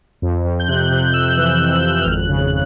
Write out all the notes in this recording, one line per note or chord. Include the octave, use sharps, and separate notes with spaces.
F2
F2
G6
C3 F#6
C3
C3 E6
E3 F#6
F2 G6
F2 G6
F#6
G#1 F6
F#6
C#3